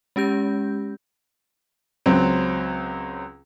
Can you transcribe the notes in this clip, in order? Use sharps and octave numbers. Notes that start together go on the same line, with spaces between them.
G#3 C#4 G4 G6
C#2 F#3 C4